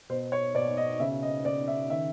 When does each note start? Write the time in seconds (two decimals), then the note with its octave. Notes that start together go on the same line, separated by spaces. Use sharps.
0.10 B2 C5
0.32 C#5
0.55 B2 D5
0.77 D#5
1.00 C#3 E5
1.23 D#5
1.45 C#3 D5
1.68 E5
1.90 D#3 E5